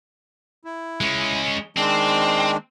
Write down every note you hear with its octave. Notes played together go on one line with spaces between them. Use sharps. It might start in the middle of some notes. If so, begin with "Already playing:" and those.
E4
G#3 C#4
D#3 G#3 C4 D4